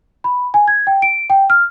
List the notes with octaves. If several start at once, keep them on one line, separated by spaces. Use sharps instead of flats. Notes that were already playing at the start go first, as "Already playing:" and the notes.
B5
G#5
G#6
G5
D7
G5
F6